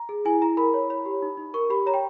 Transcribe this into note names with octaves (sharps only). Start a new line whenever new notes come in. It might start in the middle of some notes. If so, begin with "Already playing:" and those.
Already playing: A#5
G#4
E4 G#5
E4 A#5
A#4 B5
C#5
C#5 B5
G4
D#4
D#4
A#4 C#6
G4 B5
C#5 A#5
G5